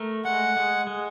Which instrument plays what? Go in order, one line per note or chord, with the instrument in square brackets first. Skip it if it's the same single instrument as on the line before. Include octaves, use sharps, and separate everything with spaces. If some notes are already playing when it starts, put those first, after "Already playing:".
Already playing: [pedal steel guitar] A3 A#4
[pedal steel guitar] G#3 [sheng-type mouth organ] F#5
[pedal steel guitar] G#3
G#3